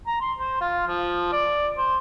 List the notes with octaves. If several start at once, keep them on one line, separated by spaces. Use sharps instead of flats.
A#5
C6
C5
F4
F3
D5
C5